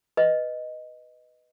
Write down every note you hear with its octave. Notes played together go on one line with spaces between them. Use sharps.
B4 D#5